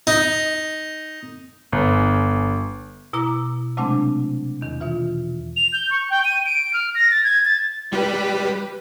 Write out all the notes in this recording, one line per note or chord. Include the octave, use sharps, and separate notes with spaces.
D#4
G1
B2 E4 A#5 D6
C3 F#3 G#3 A3 C4 D4
E2 D#3
B2 E3 F4
F7
G6
C#6
G5
D#7
D7
F6
A#6
A6
G#6
A6
G3 G4 B4